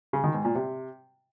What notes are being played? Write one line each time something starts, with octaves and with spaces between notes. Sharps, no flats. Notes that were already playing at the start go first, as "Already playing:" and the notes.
C#3
D#3
G#2
A#2
C3